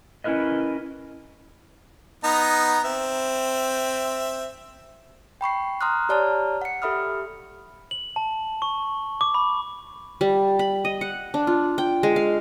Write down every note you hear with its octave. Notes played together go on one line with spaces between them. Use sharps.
C#4 E4 A#4 B4 D#5
B3 D#4 A#5
C4 E5
G5 B5 C#6 C7
A#5 C6 D#6 F6 F#6
G4 C#5 D5 A5 A#5 F6
F#5 C#7
G4 A4 E5 B5 D#6 F6
F#7
A5
C#6
D6
B5
G3
B5
D#5
F#5
D4
F4
G5
G#3
F5